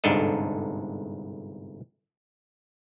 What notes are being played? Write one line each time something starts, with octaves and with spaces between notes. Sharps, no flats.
G1 C2 G#2 D4 A4 D#5